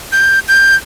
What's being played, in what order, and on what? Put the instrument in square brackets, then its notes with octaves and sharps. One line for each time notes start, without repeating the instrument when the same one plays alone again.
[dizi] G6
G6